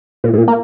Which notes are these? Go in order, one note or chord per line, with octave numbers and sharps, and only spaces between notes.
A#2
G#2
A#2
A#3